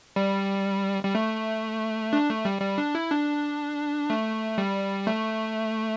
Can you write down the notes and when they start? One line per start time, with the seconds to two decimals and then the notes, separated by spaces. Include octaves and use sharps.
0.16 G3
1.03 G3
1.15 A3
2.13 D4
2.29 A3
2.45 G3
2.61 G3
2.78 D4
2.95 E4
3.11 D4
4.10 A3
4.58 G3
5.07 A3